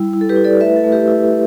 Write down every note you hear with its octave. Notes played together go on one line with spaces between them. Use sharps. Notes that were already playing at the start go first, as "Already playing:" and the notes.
Already playing: G3 E4
E4
A4
G4 B4
E4
A4 D5
A3 B4 E5
A4
A3
G4 B4
E4